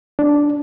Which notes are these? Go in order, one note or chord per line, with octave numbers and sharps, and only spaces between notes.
D4